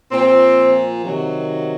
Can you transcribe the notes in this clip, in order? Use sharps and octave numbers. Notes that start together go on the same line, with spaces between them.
A#2 F3 C4
C3 D#3 F#3